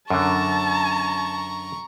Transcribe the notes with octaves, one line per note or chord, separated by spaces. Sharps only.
F#2 D3 A5 A#5 C#6